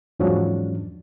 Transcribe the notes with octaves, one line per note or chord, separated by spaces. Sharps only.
E2 G#2 F3 F#3 C#4 D4